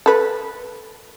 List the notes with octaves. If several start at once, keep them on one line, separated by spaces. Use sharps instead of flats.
A4 B4